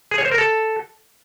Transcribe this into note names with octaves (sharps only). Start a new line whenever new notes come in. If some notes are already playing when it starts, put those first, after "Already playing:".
G#4
C#5
C5
A#4
A4